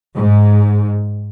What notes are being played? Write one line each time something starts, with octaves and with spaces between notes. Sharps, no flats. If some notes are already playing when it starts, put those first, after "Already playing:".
G#2